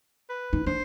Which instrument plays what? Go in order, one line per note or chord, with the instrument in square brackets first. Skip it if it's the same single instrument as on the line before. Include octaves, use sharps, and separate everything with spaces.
[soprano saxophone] B4
[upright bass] D#4
[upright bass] D4 [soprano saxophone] C5